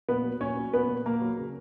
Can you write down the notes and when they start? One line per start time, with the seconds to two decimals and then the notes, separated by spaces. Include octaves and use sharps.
0.09 A#2 B3 B4
0.24 F#3
0.40 A#2 C#4 C#5
0.56 F#3
0.73 A#2 B3 B4
0.89 A#2
1.05 A#2 A#3 A#4
1.21 F#3
1.38 C#3